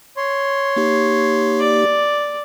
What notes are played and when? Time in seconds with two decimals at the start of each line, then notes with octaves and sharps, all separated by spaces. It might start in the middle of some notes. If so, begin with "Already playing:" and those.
0.17 C#5 C6
0.76 A#3 D#4 G4
1.60 D5